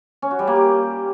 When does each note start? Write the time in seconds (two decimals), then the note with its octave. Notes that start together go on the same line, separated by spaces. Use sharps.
0.22 C#4
0.31 F#4
0.39 G3
0.47 A#3
0.56 G4